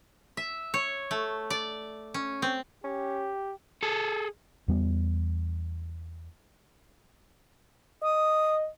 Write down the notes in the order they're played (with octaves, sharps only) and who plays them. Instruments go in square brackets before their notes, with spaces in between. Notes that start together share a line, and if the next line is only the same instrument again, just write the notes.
[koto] E5
C#5
A3
D5
C#4
C4
[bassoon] C#4 [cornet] G4
[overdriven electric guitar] G#4 A4
[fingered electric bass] E2 G3 B3
[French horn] D#5 [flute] D#6